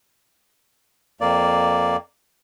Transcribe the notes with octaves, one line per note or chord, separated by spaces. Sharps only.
F2 A#3 D5